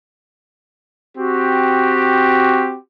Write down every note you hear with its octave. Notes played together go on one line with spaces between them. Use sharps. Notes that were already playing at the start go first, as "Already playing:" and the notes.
C4 F#4 G4